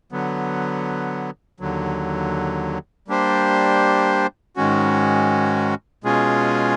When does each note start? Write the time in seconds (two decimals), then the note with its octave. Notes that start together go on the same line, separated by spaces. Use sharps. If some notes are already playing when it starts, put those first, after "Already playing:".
0.12 D3 F#3 B3
1.60 D#2 D3 F#3
3.08 G3 A#3 D4 G4 C5
4.56 G#2 D#3 G#3 C#4 F#4
6.04 B2 G#3 C#4 F4 G#4